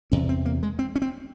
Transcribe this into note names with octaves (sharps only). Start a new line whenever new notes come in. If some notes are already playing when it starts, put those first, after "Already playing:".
E2 C3 C#4
C4
A#3
G#3
C4
C#4
C4